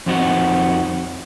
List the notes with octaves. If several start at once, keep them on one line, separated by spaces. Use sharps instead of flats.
F2 F3 C4 D#4 F#4